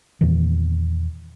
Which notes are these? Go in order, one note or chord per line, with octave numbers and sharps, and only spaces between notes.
E2 A#2 D#3 E3